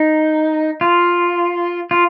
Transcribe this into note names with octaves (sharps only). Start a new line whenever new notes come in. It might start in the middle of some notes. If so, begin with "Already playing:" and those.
Already playing: D#4
F4
F4